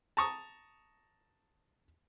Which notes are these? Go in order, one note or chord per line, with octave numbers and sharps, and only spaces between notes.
A5 A#5 C#6 D#6